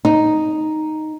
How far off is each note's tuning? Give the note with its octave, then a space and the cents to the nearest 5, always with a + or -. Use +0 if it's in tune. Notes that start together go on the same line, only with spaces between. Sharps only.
D#4 +0